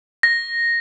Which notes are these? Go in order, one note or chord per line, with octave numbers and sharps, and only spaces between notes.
A#6